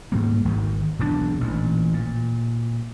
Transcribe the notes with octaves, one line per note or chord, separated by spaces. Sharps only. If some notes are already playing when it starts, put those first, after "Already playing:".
G#2 G3 A#3
G#1 D#3
E1 B1 C3 D4
A1 A#2 E3
A#2